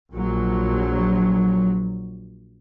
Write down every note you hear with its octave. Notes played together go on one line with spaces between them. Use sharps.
A#1 F#3